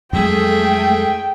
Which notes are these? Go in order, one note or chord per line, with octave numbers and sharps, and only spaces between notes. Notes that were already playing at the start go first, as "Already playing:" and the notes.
F2 F#3 G#3 A3 G#4 E5 G5